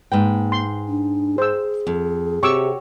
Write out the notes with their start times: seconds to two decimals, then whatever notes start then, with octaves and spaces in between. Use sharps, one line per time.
0.12 G#2 A#3 B4 G5
0.52 C6
0.88 D4
1.38 G#4 C5 E6
1.87 F2
2.43 C3 F#4 G4 C#5 C#6 D6 E6